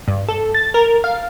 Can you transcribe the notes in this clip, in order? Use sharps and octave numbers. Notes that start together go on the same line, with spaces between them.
G2
A4
A6
A#4
F5